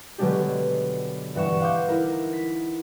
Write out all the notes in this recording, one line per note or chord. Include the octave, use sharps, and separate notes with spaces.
B2 D3 F#3 G#3 D4 G4
G2 E3 E4 F#5 C#6 E7
F5 F#5 C6 D6 G6
D#4 E4 A#4
B6